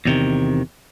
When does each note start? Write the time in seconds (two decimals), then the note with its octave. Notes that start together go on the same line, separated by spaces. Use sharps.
0.05 E2 C3 D#3